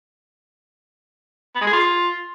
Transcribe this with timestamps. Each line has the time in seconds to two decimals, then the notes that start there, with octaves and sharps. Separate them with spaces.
1.55 B3
1.61 G#3
1.67 G#4
1.73 F4